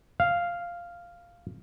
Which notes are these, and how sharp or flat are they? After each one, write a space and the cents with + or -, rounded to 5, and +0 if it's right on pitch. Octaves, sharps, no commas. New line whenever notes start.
F5 -5